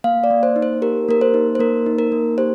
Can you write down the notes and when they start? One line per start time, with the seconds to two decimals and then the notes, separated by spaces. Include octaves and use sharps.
0.04 A#3 F5
0.24 D5
0.30 A#3
0.43 C5
0.56 D#4
0.62 C5
0.82 G4 A#4
1.08 A#3 A#4
1.21 C5
1.34 D#4
1.55 C5
1.59 A#3 A#4
1.86 D#4
1.99 A#4
2.12 A#3
2.38 G4 C5